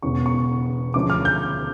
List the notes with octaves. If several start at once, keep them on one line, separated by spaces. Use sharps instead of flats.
E1 E2 C#3 C#6
C#6
D2 C#3 F3 D6
F6
G6